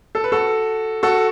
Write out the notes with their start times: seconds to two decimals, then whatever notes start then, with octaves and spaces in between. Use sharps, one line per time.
0.15 A4
0.24 B4
0.32 F#4 A4
1.03 F#4 A4